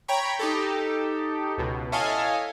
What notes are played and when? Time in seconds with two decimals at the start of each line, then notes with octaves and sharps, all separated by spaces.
0.08 C#5 G5 A#5 B5 C#6
0.39 D#4 G4 A4
1.58 C#2 B2
1.92 E4 A4 C#5 D#5 F5 G#5